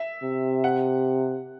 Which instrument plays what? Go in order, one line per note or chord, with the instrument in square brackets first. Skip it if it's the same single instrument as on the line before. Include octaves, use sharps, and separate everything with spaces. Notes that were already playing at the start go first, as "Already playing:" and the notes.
Already playing: [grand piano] E5
[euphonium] C3
[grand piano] F#5